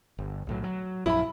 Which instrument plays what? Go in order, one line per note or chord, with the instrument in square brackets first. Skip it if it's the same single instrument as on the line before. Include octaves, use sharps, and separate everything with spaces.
[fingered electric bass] G1
B1 A2 F#3
F#3
[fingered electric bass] A#1 F#2 F3 [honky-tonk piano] E4 B5